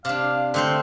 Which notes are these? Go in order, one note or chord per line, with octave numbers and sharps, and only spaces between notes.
C3 D4 F5
D3 A3 C4 F5